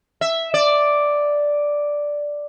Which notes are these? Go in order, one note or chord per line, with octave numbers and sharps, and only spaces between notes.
E5
D5